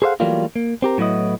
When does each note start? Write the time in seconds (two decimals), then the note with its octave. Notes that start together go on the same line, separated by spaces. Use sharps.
0.02 G#4 A4 C5 C#5 F5 F#5
0.20 E3 F#3 G3 A3 A#3 F4
0.56 A#3
0.82 C4 G4 A#4
0.98 A2 F#3 B3 E4 D#5